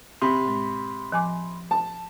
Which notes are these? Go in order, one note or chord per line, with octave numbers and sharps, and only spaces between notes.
C3 B5 C6
A2 G#3
F3 G#5 D6
A5